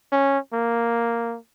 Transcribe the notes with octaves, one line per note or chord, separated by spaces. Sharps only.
C#4
A#3